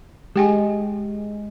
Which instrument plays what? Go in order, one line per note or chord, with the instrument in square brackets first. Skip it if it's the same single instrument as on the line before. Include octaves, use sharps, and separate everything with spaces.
[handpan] G#3 [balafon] G4 G5 G#5